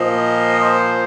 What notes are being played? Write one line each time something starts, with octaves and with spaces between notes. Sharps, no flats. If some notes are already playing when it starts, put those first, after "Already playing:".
Already playing: A#2 F3 D#5
C5